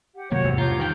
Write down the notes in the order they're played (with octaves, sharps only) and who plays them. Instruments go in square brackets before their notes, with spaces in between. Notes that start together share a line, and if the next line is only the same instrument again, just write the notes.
[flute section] G4 F#5
[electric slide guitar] F#2 D#3 [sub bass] C3 [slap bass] A#3 [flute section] F#4 C#5 F#5
[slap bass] E2 [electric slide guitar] G#2
[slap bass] G2 [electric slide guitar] F4 [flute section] G4 A#5 G6
[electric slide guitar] D#3 F5 G5